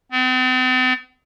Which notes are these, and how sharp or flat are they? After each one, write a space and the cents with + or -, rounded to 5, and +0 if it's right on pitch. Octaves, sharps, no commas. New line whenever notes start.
C4 -45